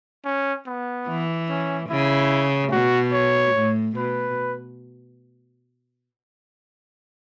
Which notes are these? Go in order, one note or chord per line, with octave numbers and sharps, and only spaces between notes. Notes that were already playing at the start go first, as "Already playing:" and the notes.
C#4
B3
E3
C#4
C#3 E4
B2 F#4
C#5
A2
B2 B4